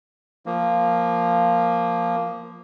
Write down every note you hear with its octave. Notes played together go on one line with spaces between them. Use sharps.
F3 A#3